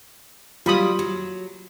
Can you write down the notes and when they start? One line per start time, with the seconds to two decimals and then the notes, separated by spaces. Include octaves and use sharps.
0.66 F#3 G3 F4 B5 D#6
0.99 F#3